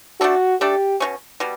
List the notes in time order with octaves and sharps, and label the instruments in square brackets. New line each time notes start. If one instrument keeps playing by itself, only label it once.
[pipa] A3 D4 A4 [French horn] F#4
[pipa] A3 D4 A4 [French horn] G4
[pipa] B2 G3 C#4
B2 G3